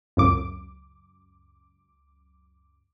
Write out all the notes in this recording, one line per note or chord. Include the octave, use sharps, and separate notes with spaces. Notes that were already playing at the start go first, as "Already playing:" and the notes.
C#2 F#2 D6